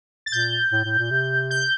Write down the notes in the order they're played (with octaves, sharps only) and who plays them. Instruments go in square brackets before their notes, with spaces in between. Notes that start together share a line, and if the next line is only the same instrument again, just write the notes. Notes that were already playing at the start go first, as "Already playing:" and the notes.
[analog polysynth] A6
[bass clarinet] A#2 [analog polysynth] G6
[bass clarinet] A2
A2
A#2
C3
[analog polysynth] G6